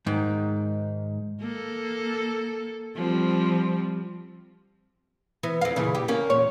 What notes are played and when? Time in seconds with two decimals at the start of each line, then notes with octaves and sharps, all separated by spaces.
0.06 G#2 D#3
1.41 A#3 A4
2.96 F3 G3 C4
5.43 E3 B3
5.61 F2 F5
5.76 A#2 C#3 E3
5.95 G4
6.08 A#3 C#4
6.30 E2 A#2 C#5